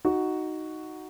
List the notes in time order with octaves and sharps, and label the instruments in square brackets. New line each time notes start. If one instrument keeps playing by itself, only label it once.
[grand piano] D#4 F#4